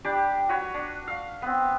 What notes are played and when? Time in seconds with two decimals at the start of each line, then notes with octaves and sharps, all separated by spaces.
0.05 G3 D4 G4 D6
0.49 F#4 B4 C#5
0.74 D4
1.07 F5
1.42 B3 C4